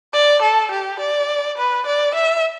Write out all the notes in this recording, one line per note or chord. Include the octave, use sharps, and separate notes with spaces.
D5
A4
G4
D5
B4
D5
E5